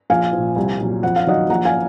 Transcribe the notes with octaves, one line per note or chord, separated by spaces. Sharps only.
A#1 F5 G#5
A#2 F3
C2
A#2 F#3
F2 F#5
F5
D#3 F#3 D#5 F#5
A#1 F#5 A#5
F5 G#5